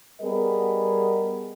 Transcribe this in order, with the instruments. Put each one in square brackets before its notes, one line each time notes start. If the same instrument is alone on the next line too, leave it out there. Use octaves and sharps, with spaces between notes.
[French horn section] G3 B3 G#4 A#4 D#5